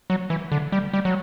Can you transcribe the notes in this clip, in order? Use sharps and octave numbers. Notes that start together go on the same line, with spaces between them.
F#3
E3
D3
G3
G3
F#3